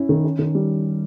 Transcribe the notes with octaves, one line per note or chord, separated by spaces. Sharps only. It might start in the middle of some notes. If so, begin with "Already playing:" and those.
Already playing: C#4 E4
D#3
C#4
D#3
G3